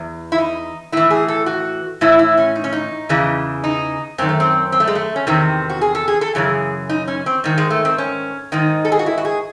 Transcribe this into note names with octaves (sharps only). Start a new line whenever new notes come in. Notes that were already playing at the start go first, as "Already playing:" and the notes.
Already playing: E2
E4
D#4
A2 E3 E4
G#4
A4
F#4
A2 E3 E4
E4
C#4
D#4
C#4
D#4
E2 C#3 E3
D#4
F#2 D#3 C4
A3
C4
C4
A3
G#3
A3
C#4
E2 C3 D#3 C4
F#4
G#4
A4
G#4
A4
F#2 C#3 E3 G#4
D#4
C#4
C4
G#2 D#3
G#3
A3
C4
C#4
G#2 D#3 D#4
A4
G#4
F#4
E4
F#4
G#4